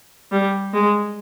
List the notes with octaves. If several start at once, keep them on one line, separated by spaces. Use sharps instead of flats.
G3
G#3